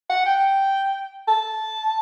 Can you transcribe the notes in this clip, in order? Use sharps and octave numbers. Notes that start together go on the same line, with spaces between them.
F#5
G5
A5